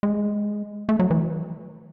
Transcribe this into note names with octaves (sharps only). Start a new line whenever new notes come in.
G#3
A3
F#3
E3